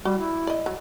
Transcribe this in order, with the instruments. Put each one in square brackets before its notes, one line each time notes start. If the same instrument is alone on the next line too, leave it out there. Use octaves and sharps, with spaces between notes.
[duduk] G3 [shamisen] F#4
[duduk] E4
[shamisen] D5 D#5
F#3